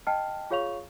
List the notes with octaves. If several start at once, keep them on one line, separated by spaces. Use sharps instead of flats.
D#5 G5 A5 F6 C7
F4 G#4 C#5 F5 C#6 F7